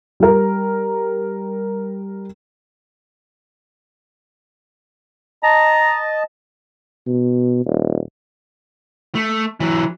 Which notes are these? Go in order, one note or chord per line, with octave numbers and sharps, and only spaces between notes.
G3 A#4
D#5 A5 A#5
B2
D#1
A3
E3 F#3